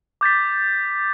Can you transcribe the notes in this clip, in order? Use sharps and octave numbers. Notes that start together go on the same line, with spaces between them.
D6 G6 A6 B6